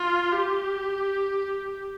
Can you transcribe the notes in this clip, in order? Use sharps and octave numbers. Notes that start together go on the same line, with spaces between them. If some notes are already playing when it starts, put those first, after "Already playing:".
Already playing: F4
G4